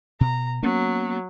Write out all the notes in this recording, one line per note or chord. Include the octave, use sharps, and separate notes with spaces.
B2 A#5
F#3 A#3 B3 C#4